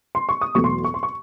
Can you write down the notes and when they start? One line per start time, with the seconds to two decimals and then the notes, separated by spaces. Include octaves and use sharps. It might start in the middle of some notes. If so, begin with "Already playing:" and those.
0.15 C6
0.29 C#6
0.41 D#6
0.55 E2 B2 F#3 A3 C#6
0.64 C6
0.84 C#6
0.94 C6
1.03 C#6